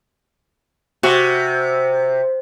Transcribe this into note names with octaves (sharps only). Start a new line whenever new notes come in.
C3 F#4